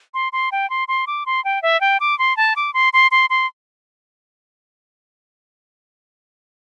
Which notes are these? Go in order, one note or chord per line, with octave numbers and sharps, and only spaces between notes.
C6
C6
G5
C6
C6
D6
C6
G5
E5
G5
D6
C6
A5
D6
C6
C6
C6
C6